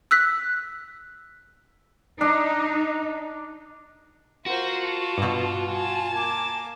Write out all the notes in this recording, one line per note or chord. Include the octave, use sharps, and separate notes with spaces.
E6 F#6 B6
D4 D#4
F4 F#4 A#4 C5
A5
G2 B2
G#5 A5
A#3 D6